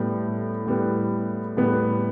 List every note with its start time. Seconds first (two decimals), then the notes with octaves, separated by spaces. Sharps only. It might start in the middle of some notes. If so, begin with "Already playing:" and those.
Already playing: A2 G3 B3
0.66 A2 G3 B3
1.57 A2 G3 B3